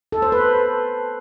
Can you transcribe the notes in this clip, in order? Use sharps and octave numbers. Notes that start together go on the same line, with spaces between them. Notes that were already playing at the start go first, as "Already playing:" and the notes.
A4
C5
B4